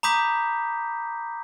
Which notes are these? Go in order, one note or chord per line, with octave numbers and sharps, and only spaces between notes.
A#5 B5 D6 D#6 G6 B6